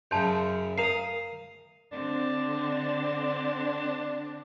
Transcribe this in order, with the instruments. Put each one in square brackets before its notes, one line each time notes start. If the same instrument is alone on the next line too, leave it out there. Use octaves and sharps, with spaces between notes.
[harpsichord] F#2 C#3 [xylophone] A5 C6 G6
[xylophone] A#4 A#5 C7 [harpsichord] F5 D#6
[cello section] D3 C4 [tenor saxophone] D4